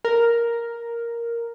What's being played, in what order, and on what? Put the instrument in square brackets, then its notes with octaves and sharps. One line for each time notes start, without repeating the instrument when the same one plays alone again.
[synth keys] A#4